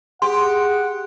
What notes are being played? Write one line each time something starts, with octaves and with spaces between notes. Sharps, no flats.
G4 G#4 F#5 C6